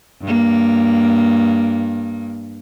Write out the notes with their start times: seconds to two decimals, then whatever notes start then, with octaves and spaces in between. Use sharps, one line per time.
0.22 G2 A#3